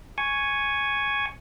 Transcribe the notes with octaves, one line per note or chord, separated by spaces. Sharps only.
G#5 C#6